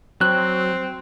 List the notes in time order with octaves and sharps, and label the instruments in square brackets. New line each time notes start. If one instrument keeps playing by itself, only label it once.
[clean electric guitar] F#3 [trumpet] C4 [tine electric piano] F#6